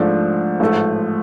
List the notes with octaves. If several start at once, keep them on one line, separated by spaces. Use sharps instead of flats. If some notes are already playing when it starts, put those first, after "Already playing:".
Already playing: G#2 F3 A3 D4
A1 G#2 F3 A3